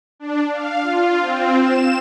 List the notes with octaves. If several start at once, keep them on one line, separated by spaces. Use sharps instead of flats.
D4
F5
F4
C4
E7